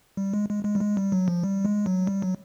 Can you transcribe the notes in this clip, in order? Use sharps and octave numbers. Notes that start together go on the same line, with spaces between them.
G3
G#3
G#3
G#3
G3
G#3
G3
F#3
F3
G3
G#3
F#3
G3
F#3